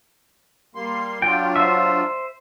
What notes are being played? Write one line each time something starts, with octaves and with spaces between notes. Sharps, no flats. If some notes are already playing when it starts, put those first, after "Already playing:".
G3 A#3 C6
F#3 D4 F4 G5
C5 E5